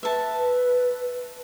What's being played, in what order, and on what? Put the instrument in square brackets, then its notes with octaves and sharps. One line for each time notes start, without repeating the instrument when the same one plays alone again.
[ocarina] B4 [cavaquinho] E5 A5